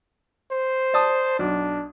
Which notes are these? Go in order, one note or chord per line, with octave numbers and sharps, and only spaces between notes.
C5
D5 A5 D#6
B1 D4